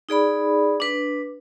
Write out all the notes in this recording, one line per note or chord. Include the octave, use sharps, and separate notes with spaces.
D#4 G#4 D5 B5
D4 B4